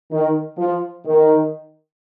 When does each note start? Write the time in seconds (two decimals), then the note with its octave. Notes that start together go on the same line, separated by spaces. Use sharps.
0.12 D#3
0.58 F3
1.06 D#3